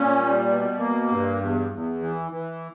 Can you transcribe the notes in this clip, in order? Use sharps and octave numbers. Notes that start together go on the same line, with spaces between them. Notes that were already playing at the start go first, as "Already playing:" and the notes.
Already playing: A#2 C#4
G3
B2
A#3
G2
E2
E2
E3
E3